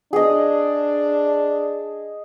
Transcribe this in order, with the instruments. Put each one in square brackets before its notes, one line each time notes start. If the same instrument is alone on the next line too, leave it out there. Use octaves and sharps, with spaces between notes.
[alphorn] D4 [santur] G#4 D#5